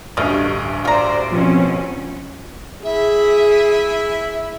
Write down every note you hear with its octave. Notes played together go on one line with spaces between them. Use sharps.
A1 D2 G2 D#5 F5
F4 C5 D5 A#5
B2 F3 C4 C#4
E4 G#4 E5